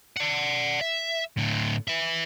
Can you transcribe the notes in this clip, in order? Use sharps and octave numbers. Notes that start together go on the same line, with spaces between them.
D5 F#5
E5
A2 D3
B4 E5